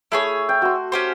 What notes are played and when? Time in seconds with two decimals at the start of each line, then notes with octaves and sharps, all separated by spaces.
0.12 A3 E4 G#4 C#5
0.49 G5
0.62 F#4 C6
0.92 C#4 G4 C5